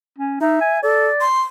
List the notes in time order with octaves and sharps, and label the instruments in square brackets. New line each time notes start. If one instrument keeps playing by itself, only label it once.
[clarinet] C#4
[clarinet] D#4 [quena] E5
[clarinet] G#5
[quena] A4 [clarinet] D5
[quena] C6